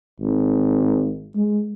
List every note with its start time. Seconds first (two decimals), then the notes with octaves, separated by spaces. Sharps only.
0.20 G#1
1.36 G#3